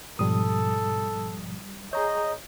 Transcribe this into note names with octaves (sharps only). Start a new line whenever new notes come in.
G#2 B2 F3 G3 A4 D#6
G#4 C#5 D#5 A#5 G6